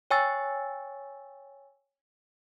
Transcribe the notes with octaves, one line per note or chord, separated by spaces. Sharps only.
C#5 G5 G#5 C#6 E6 A6